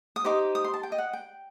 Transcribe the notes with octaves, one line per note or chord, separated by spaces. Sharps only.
D#6
D#4 G4 C5 D6
D#6
C6
A5
G5
D#5
F#5
G5